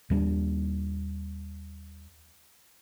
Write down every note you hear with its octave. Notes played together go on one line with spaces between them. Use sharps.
D#2 G3 A3 D4